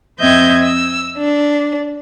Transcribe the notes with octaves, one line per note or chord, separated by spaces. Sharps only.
F2 C4 D#5 E5 G6 G#6
E6
D4